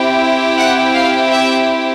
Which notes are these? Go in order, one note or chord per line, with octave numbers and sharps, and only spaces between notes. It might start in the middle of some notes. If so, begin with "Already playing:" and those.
Already playing: C4 E4 G4
F#5
F5
E5